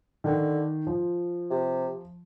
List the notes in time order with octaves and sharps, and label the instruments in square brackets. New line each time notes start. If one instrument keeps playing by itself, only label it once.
[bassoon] D3 [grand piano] D#3
[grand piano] F3
[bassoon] C3